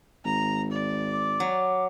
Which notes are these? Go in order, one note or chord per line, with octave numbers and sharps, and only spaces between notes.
G#1 A#5
D5
D6
F#3